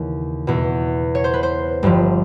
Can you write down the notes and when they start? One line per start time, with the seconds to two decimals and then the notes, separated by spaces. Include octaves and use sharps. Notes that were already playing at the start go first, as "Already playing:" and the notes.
Already playing: D#2 C#3 E3
0.47 E2 B2
1.15 C#5
1.24 C5
1.33 B4
1.43 C5
1.83 G1 G2 D3 F3